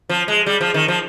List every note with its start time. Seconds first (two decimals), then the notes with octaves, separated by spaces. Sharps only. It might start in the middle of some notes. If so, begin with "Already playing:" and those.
0.09 F3
0.28 G#3
0.46 G3
0.61 F3
0.74 D#3
0.88 F3